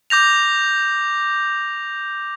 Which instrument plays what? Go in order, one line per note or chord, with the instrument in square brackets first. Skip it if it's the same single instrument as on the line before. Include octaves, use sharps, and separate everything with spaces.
[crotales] D6 G6 A#6 F7